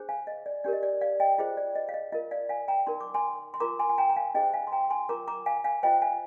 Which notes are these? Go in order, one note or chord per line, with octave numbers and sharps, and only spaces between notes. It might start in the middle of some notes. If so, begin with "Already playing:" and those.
Already playing: D4 G#4 C5
F5 G#5
D#5
D5
D4 G4 A#4 D5
D#5
D5
D5 F5
D#5 G5
F4 G#4 C5 D#5
D5
D#5
F5
D#5
F4 A#4 D#5
D5 F5
F5 G#5
G5 A#5
D#4 A#4 C6
D6
G#5 C6
C6
F4 A#4 A#5 D6
G#5 C6
G#5
G5 A#5
A#5
F5 G#5
D#4 G#4 C5 D#5 G5
F5 G#5
C6
G5 A#5
G#5 C6
F4 A#4 A#5 D6
A#5 D6
F5 G#5
F5 G#5
F4 C5 D#5 G5
F5 G#5